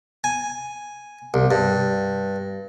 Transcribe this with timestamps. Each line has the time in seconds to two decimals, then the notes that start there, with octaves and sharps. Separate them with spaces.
0.24 G#5
1.34 C2
1.51 G2